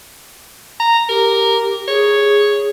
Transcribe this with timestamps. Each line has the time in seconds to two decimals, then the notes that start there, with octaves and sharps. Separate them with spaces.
0.80 A#5
1.09 G4 A#4
1.88 G#4 C#5